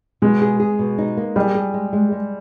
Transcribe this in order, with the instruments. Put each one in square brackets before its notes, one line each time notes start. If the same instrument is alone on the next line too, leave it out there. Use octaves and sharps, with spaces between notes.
[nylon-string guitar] B2 [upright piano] G#3
[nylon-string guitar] G#4
G#4
B2
D#4
A#3
[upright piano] G3 [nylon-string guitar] G#4
[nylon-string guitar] G#4
G#3
G#3
G#3